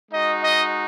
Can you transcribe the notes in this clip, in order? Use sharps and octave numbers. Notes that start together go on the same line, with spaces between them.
G#3 D#4 F#4 D#5
D#5